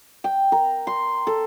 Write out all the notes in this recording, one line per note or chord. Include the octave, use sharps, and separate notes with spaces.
G5
A#4
C6
A4